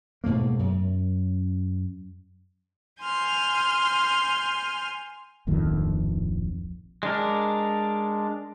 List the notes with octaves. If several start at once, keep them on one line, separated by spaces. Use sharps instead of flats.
G#2 B2 A3 A#3
F#2
G#5 C6 F6 G6
D1 A#1 F2 D#3
G#3 D4 A#4